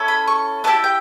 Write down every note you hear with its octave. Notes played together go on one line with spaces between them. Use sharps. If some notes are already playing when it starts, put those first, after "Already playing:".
Already playing: C#4 E4 A4
B5
C#6
B3 A5
E4 G4
G5